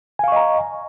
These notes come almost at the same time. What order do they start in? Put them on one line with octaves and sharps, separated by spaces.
G#5 F5 C#6 D#5 A#5